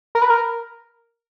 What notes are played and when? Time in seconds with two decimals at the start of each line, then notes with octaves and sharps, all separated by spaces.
0.15 A#4
0.22 B4
0.30 A#4